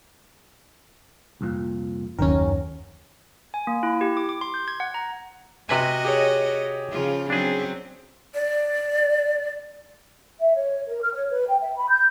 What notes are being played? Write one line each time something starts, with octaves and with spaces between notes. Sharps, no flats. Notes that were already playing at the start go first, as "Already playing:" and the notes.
C2 F2 A#2
F#1 D#2 D#3 E3 F#3 C#4 A#4
G#5
A#3
E4
G4
D6
D6
C6
G6
G#6
F#5
A#5
C3 F#4 B4 D#5 G#5
G4 G#4 C#5
C#3 F3 F4
F#3 C4 D4 G#4
D5
E5
C#5
A#4
F6
C#5
B4
G5
E5
B5
G6